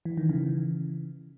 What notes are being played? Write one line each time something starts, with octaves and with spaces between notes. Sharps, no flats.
E3
D#3
C#3 E3